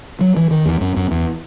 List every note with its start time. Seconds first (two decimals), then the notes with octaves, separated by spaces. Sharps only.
0.21 F#3
0.37 E3
0.51 D#3
0.65 E2
0.81 F#2
0.96 F#2
1.11 E2